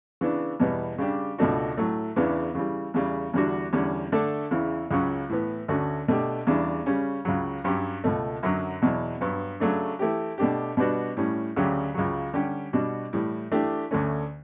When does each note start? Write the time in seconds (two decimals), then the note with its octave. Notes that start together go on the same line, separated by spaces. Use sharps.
0.21 C#3 E3 B3 D4
0.60 E2 B2 G3 B3
0.98 C#3 G3 D4 G4
1.38 C#2 B2 A3 D4 F#4
1.77 A2 F#3 A3
2.16 E2 C#3 E3 B3 D4
2.55 C#3 E3 G3
2.94 E2 C#3 G3
3.34 E2 D3 G3 D4 F#4
3.73 E2 D3 G3 C#4
4.12 D3 A3 D4 A4
4.51 E2 C#3 E3
4.91 C#2 C#3 F#3 C#4
5.29 A2 E3 B3
5.68 D2 D3 A3 C#4 F#4
6.08 B2 A3 D4 G4
6.47 E2 C#3 E3 G3 D4
6.86 C#3 G3 C#4
7.25 C#2 C#3 F#3
7.64 G2 F#3 C#4 G4
8.04 C#2 B2 A3
8.43 F#2 D3 F#3
8.82 E2 B2 F#3
9.21 G2 F#3 B3
9.60 C#3 F#3 A3 D4
9.99 E3 A3 E4 G4
10.38 B2 A3 D4 G4
10.77 B2 G3 B3 D4 F#4
11.17 A2 G3 C#4
11.56 D2 C#3 F#3 C#4 G4
11.94 C#2 C#3 F#3
12.34 D3 G3 C#4 G4
12.73 B2 G3 D4 F#4
13.13 A2 E3 G3
13.52 E3 A3 D4 G4
13.91 D2 D3 A3 C#4